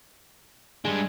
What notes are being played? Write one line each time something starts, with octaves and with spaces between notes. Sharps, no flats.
G3 G#3 D4